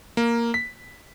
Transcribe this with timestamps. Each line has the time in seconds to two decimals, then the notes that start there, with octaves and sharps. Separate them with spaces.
0.17 A#3
0.54 B6